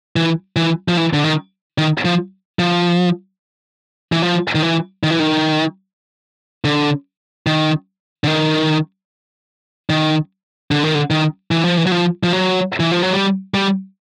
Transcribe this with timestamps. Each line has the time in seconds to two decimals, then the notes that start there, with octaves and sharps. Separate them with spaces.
0.16 E3
0.56 E3
0.88 F3
0.97 E3
1.13 D3
1.24 D#3
1.78 D#3
2.05 F3
2.59 F3
4.12 E3
4.22 F3
4.55 D#3
4.63 E3
5.03 D#3
5.11 E3
5.19 D#3
6.65 D3
7.47 D#3
8.24 D3
8.27 D#3
9.90 D#3
10.71 D3
10.84 D#3
10.95 D3
11.11 D#3
11.51 E3
11.64 F3
11.77 E3
11.87 F#3
11.92 F3
12.23 F3
12.33 F#3
12.80 E3
12.91 F3
13.03 F#3
13.13 G3
13.54 G3